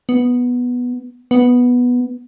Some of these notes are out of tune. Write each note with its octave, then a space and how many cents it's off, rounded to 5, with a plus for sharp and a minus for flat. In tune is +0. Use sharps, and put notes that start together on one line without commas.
B3 -5
B3 -5